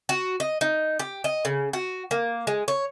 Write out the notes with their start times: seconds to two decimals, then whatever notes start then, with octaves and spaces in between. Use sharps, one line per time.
0.09 F#4
0.40 D#5
0.61 D#4
0.99 G4
1.24 D#5
1.45 C#3
1.73 F#4
2.11 A#3
2.47 G#3
2.68 C#5